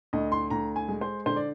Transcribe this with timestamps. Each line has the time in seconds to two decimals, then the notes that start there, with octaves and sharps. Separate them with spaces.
0.13 D2 D#5
0.32 C6
0.50 D2 A#5
0.76 G#5
0.88 G#3
1.01 C5
1.26 D3 C5
1.36 D5